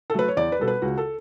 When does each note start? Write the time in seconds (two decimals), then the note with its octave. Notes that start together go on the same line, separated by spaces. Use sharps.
0.10 A4
0.14 F#3 A3 B4
0.28 C#5
0.37 E2 D5
0.52 B4
0.59 B2 G3 A4
0.68 B4
0.82 C#2 F#4
0.97 A4